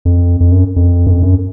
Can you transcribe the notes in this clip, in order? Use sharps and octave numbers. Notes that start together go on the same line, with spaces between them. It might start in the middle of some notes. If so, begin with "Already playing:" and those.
F2
F2
F#2
F2
F#2
F2
F#2